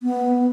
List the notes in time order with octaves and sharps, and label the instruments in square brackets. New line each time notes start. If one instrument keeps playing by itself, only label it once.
[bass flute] B3